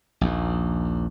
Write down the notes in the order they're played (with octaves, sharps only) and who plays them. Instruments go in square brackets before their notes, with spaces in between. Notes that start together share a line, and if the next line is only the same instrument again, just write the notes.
[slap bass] A#1 D#2